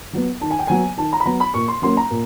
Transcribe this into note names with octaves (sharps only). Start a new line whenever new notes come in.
F#3 B3
D#3 A5
G#5
G5
F#3 B3 G#5
D#3 A5
A#5
B5
F#3 B3 A#5
B5
A#2 C#6
C6
F#3 A#3 C#4 C6
A#5
A#2